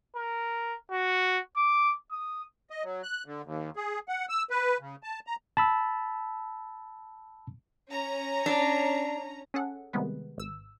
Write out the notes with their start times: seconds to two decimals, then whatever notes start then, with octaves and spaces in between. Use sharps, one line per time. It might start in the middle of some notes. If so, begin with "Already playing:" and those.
0.16 A#4
0.91 F#4
1.56 D6
2.11 D#6
2.70 D#5
2.83 F#3
3.03 F#6
3.26 D3
3.44 D#2
3.76 G#4
4.08 F#5
4.29 E6
4.50 B4
4.80 C#3
5.03 A5
5.27 A#5
5.57 A5 B5 E6
7.90 C#4 A#5
8.46 D4
9.54 C#4 G#4 A4 F#5
9.93 C3 D#3 G3 G#3 B3 B4
10.38 G#1 E6